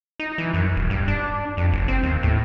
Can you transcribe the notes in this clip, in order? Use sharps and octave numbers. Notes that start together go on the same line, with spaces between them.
D#4
E3
F#2
D#1
G2
D4
F2
F#1
C4
D#2
A2